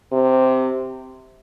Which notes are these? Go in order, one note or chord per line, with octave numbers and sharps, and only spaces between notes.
C3